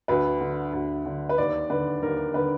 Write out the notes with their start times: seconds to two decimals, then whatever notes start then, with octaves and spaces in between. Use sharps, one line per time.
0.08 D2 B4
0.41 D3
0.73 D2
1.06 D3
1.29 B4
1.38 D#2 D5
1.70 D3 B4
2.02 D#2 A#4
2.34 D3 B4